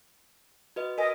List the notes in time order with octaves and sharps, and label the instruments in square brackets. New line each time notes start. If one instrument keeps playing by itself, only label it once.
[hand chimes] F#4 B4 D#5
[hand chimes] A#4 G#5 [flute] D#5